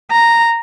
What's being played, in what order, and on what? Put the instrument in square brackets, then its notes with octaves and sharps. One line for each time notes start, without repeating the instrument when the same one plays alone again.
[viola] A#5